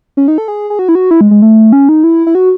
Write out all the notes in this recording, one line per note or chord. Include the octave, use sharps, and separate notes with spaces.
C#4
D#4
A4
G#4
G#4
F#4
E4
F#4
E4
G#3
G#3
A3
C#4
D#4
E4
E4
F#4